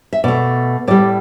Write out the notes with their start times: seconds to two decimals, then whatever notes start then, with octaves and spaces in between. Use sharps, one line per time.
0.13 E5
0.24 B2 A3 D5
0.88 A2 G3 D5